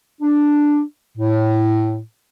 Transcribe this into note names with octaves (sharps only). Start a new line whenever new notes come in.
D4
A2